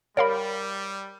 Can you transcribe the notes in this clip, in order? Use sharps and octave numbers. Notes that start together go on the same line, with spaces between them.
G3 A#4 C#5 F5 B5